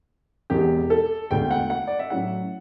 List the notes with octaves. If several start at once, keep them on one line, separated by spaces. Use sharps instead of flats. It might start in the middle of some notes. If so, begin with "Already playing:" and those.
E1 E2 B2 G4
A4
E1 D2 D3 G5
F#5
F#5
D5
E5
A2 F#3 C#4 F#5